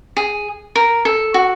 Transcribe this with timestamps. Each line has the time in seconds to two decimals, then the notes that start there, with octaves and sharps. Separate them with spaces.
0.17 G#4
0.75 A#4
1.05 A4
1.34 F#4